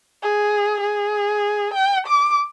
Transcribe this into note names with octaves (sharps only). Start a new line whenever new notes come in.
G#4
G#4
G5
D6